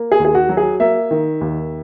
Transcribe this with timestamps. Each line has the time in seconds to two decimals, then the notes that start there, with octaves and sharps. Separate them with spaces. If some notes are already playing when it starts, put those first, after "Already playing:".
Already playing: A#3
0.12 G#4
0.20 D#2
0.25 G#4
0.35 F#4
0.49 F#3
0.57 G#4
0.80 A#3 E5
1.11 D#3
1.41 D#2